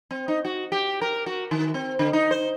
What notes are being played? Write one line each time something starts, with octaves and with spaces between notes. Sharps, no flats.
C4
D#4
F#4
G4
A#4
F#4
D#3
C4
D3
D#4
C5